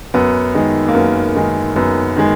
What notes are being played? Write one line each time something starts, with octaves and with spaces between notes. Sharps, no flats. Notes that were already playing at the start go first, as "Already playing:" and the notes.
F#2 B3
D#3 G#3
A#3
F#2 B3
D#3 G#3
F#2 B3
D#3 G#3